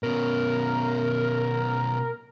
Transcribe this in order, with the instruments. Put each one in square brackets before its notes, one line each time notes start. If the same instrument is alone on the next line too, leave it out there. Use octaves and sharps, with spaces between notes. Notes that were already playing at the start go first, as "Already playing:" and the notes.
[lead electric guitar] B2 C#4 [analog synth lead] A#4